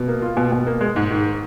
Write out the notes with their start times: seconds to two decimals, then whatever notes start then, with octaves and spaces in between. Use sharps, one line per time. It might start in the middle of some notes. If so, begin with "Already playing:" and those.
Already playing: B2
0.08 A#3
0.22 F4
0.37 B2
0.52 B2
0.67 A#3
0.81 G#3
0.96 G#2
1.11 D#3